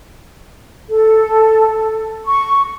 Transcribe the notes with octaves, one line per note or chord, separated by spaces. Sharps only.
A4
C#6